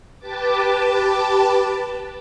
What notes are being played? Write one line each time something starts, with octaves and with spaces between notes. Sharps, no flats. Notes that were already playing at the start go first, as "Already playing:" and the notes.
G4 B4 A5 D6